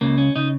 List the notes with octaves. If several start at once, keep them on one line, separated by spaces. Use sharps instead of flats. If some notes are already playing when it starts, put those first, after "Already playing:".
C#2 C#3 A#3
C#4
C#3 D#4